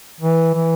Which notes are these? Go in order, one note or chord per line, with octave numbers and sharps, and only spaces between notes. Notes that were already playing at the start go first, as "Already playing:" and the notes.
E3
E3